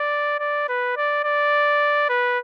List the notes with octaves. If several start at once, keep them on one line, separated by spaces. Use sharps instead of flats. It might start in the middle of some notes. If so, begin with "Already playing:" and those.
Already playing: D5
D5
B4
D5
D5
B4